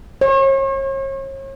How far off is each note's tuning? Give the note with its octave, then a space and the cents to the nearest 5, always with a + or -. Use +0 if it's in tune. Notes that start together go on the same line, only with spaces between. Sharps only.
C#5 -40